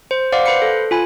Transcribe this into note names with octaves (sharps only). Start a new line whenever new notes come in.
C5
C5 D5 F5 F#5 D6
B4 C5 B5 C7 C#7
A4
F4 G#5 B5